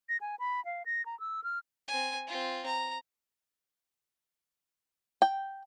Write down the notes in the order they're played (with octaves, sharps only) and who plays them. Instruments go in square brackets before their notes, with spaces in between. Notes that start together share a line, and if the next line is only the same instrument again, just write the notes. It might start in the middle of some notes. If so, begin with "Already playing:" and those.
[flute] A#6
G#5
B5
F5
A#6
A#5
E6
F6
[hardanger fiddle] C4 G#5
C4 F4
A#5
[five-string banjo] G5